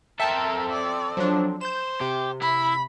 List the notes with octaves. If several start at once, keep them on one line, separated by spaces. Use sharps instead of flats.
C4 A4 A#4 E5 G5 A5
D5
F3 F#3 D4
C5 G6 E7
C3 G4
E4 B5